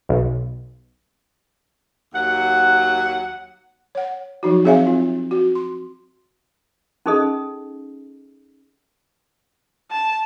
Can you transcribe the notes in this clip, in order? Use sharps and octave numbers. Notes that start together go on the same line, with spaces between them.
B1
D#2 F#3 F#5
C#5 F#5
F3 F#3 D#4 F#4
C4 G#4 C#5 E5 F5 G#5
C4 F4
F#4
C6
C#4 D#4 G#4 A4 D#5
A5